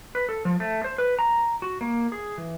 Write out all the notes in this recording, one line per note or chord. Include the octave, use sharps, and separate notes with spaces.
B4
A4
F3
A3
C5
B4
A#5
F#4
A#3
G#4
E3